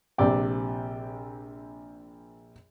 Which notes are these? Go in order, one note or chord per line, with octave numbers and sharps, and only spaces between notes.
A#1 C3 D5 G5